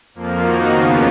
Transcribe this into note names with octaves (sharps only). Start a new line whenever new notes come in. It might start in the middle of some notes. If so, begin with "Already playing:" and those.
F2 F3 A#3
D#3 A#3 D#4 F#4
D#2 C#3 F3 B3 F4